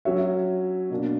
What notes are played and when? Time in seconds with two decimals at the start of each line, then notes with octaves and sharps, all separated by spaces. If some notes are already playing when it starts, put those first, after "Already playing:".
0.05 F#3 C#4 F#4 C#5 E5
0.90 B2 A#3 D4